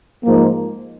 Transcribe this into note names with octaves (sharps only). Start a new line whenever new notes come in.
G#2 F3 A#3